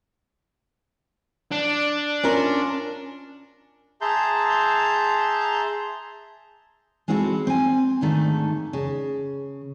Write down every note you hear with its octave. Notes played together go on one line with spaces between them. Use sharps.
D4
C#4 F4 A#4
G#4 E5 A5 A#5 C6 G6
G#3 C4 E4 F#4 G4 A4
C4 G#5
G#2 D3 D#3 A3
C#3